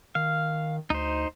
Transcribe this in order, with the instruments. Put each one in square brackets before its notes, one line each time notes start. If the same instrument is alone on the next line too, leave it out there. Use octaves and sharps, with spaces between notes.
[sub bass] D#3 [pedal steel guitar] F5
[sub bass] D2 [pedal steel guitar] D#4 C5